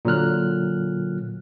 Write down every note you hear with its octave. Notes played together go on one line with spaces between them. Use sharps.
A#2 D3 F#3 F6 F#6